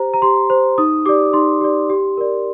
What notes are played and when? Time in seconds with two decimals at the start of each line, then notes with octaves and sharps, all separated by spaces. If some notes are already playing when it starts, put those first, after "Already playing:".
Already playing: G4 C5 A#5
0.14 A#5
0.22 G4 C6
0.50 C5
0.78 D#4 D#6
1.05 G4 D5 D6
1.33 D#4 C6
1.61 G4 D5
1.89 G4
2.17 A#4 D5